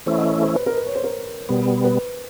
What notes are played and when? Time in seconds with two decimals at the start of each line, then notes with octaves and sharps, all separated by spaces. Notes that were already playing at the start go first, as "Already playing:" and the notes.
0.06 E3 A3 C#4 E4 C5
0.18 D#5
0.30 C#5
0.42 C5
0.55 B4
0.66 A#4
0.77 B4
0.87 C#5
0.95 C5
1.04 A#4
1.49 B2 G3 B3
1.84 B4